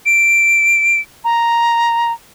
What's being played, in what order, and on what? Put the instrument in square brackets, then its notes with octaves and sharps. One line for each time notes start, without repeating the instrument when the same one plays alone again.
[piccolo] D7
A#5